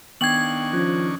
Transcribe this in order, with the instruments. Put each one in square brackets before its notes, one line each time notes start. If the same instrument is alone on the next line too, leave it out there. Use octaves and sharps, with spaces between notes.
[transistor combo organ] D#3 D4 C#6 [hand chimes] B3 G5 C7 [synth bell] G#6 F#7
[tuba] F3 [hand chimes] C#4